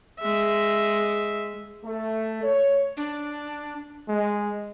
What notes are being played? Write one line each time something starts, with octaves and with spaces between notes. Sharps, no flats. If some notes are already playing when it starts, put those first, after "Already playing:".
G#3 E5
A3
C#5
D4
G#3